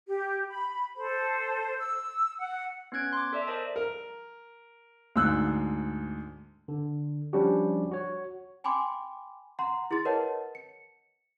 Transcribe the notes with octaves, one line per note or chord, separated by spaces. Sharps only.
G4
B5
A4 C5
E6
F#5
B3 C#4 F#6 G#6 D7
C6 D6
A4 D5 E5
A#4 C5 D#5 A5
A#4
D2 G#2 E6 F#6
D3
F3 G3 C#4 D4 F#4 G4
F#4 C#5
G5 G#5 B5 C6 D6
F#5 A#5 C6
E4 G#4 C6 A6
A#4 B4 C#5 D#5 F#5 A5
C#7